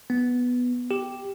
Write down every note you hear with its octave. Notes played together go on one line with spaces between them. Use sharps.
B3
G4